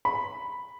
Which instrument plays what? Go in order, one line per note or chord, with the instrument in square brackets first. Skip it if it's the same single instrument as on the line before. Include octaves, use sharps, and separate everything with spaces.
[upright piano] B5